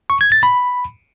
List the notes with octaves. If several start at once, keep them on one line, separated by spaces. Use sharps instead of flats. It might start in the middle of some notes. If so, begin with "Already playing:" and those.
C#6
G#6
A6
B5